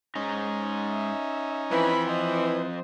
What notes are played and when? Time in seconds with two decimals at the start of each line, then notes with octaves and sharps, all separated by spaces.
0.15 G#2 G#3 C#4 D#4 A#5
0.91 E5
1.72 E3 F3 C4 B5
2.07 C5 D#5